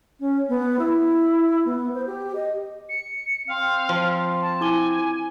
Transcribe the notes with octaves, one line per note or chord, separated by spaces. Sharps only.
C#4
B3
E4
B3
C5
G4
D#5
C#7
C4 F5
F3 C6
A5
E4 G#5 D6 G7